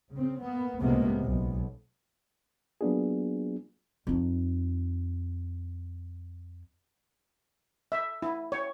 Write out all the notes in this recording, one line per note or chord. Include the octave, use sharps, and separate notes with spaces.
C#3 C4
A#3 B3
C#2 A2 C3 G#3 A#3 B3
B1
F#3 A#3 B3 D4 F4 G#4
F2 D#4
E5
E4
C#5